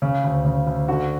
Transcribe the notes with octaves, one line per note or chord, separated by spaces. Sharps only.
C#3
D2
C#3
D2
D3 F#4